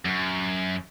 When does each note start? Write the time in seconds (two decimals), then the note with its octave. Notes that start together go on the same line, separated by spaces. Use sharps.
0.05 F#2